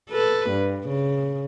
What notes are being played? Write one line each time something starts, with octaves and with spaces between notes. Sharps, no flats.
A4 B4
G2
C#3